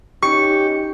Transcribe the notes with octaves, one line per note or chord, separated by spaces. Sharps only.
C#4 D#4 G4 C#6 C#7